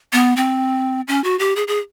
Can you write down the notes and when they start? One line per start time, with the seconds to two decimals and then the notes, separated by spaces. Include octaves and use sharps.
0.13 B3
0.37 C4
1.08 C#4
1.24 F#4
1.39 G4
1.56 G#4
1.68 G#4